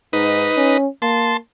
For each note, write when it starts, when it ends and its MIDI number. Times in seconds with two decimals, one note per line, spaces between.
0.13 0.49 44
0.13 0.77 63
0.13 0.77 71
0.57 0.87 61
1.02 1.37 58
1.02 1.37 81
1.02 1.37 84